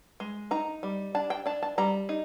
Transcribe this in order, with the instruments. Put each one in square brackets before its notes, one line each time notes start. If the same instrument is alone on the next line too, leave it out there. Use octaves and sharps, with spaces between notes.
[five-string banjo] G#3
D#4 A#5
G3
D4 A5
G5
D4 A5
A5
G3 A#5
D#4